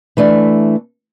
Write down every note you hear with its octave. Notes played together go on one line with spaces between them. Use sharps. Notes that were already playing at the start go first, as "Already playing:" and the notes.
E3 A3 D4